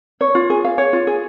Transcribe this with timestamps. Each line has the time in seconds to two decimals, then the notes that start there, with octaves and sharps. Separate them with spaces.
0.21 C#5
0.35 F4
0.50 G#4
0.64 F5
0.78 C#5
0.93 F4
1.07 G#4